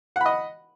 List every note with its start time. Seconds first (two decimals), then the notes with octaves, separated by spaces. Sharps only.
0.16 F#5
0.21 B5
0.26 D#5